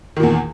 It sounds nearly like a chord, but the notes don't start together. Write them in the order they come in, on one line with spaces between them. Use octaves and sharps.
D#3 A#2 E2